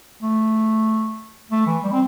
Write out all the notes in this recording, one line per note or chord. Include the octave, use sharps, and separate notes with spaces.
A3
A3
E3
G3
C4